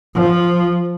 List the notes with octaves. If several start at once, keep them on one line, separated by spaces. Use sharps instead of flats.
F3